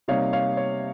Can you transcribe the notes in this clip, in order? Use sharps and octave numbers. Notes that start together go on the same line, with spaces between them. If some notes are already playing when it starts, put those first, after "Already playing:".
C3 G3 A#3 D#4 C#5 F5
C#5 F5
C#5